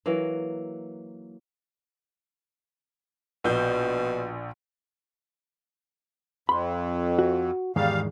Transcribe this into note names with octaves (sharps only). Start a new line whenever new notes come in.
E3 F#3 A#3
A#1 B2 G6
F2 B5 C6
F#4
E2 G#2 D#3 G3 F5